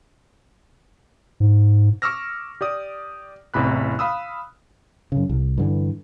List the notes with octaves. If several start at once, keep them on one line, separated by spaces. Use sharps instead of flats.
G#2
C#6 D6 E6 F6 A#6
G4 D5 D#6
A1 E2 C3 B5 F#6
F5 B5 D#6 E6
F#2 C#3
C2
G2 D3 E3